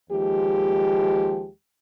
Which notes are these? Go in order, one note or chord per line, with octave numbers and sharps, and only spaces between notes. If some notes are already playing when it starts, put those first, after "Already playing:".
D#2 F3 G#3 G4